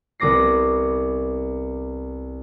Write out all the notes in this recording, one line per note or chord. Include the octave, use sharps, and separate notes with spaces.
C2 B3 D6 A#6 C7